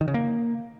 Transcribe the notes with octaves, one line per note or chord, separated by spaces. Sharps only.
D#3
C#3
A#3